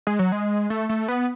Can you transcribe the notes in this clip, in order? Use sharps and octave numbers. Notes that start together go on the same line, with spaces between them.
G#3
F#3
G#3
A3
A3
B3